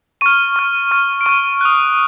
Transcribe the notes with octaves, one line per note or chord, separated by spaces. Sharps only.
C#6 F6 D#7
C#6 F6
C#6 F6
D7
C#6 F6 D#7
D#6 F#6